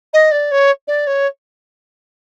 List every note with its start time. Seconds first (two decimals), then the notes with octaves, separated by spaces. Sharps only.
0.13 D#5
0.31 D5
0.51 C#5
0.88 D5
1.07 C#5